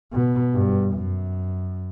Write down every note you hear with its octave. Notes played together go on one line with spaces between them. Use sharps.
B2
G2
F#2